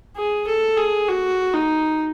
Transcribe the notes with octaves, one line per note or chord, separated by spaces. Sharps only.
G#4
A4
G#4
F#4
D#4